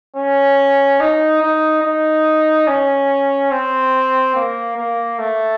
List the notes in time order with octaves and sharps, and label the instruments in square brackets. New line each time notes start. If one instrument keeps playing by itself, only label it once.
[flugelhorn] C#4
D#4
D#4
D#4
C#4
C4
A#3
A#3
A3